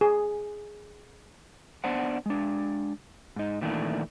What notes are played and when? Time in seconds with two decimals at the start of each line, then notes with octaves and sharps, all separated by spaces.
0.01 G#4
1.84 B3 D4 C5 F#5
2.26 G#3 D4
3.36 G#2 D#4
3.61 A#2 D#3 E3 A3 D4